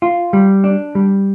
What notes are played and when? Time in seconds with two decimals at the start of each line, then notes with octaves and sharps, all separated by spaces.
0.02 F4
0.33 G3
0.64 D4
0.95 G3